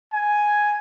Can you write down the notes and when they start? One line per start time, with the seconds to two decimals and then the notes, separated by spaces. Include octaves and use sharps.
0.13 G#5